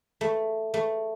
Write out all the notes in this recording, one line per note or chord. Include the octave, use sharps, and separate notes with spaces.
A3
A3